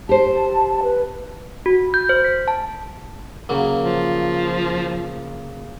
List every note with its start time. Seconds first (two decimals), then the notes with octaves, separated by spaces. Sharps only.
0.09 G4 C5 A5
0.83 B4
1.66 F#4
1.94 G6
2.09 C5
2.24 B6
2.48 A5
3.49 C#3 F#3 A#3
3.80 F3